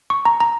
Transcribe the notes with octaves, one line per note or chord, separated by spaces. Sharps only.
C#6
A#5
A#5